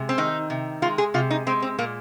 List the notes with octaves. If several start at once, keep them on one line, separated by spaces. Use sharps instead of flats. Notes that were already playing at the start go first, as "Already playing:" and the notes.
Already playing: C3 G#3
C4
D#3 D#4
C3
G#3 F4
G#4
C3 F4
D#4
G#3 C4
C4
A#2 A#3